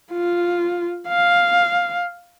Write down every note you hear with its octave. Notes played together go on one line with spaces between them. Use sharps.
F4
F5